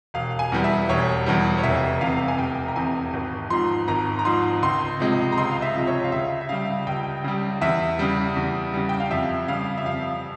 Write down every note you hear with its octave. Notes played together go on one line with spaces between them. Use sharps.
E1 F5
G#5
E2 E3 G3
E5
E1 C#5
E2 E3 G3
C#5
F1 E5
E2 C3 F5
G#5
F1 G5
A#5
E2 C3 G#5
G#1
G#2 F3 C6
G#1 A#5
A#5
G#2 F3 C6
C#2 C6
C3 F3 G#3
A#5
C#2 C6
F5
E5
C3 F3 G#3
C#5
F5
C#2 E5
E5
C#3 G3 F5
C#2 G5
C#3 G3
E2 E5
C#3 G3
E2
C#3 G3
G5
F5
F2 E5
C#3 G3 F5
E5
F2 F5